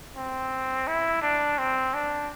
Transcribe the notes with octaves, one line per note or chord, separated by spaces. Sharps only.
C4
E4
D4
C4
D4